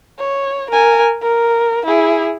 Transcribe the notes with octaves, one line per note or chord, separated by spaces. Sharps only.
C#5
A#4 G#5
A#4
E4 G#4